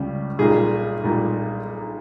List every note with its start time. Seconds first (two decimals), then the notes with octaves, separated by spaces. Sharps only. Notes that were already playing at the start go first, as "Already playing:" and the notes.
Already playing: C#2 C#3 G3
0.39 B1 A#2 G3 G#4
1.04 B1 A#2 G3